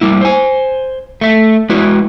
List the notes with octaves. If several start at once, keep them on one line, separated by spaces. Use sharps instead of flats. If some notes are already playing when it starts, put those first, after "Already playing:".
G3 A#3 E4
C5 G#5
A3 E5
G#3 E4 F#4 B4